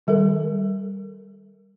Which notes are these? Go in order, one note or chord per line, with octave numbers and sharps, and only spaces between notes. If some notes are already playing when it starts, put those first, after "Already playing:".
D#3 G3 A4 A#4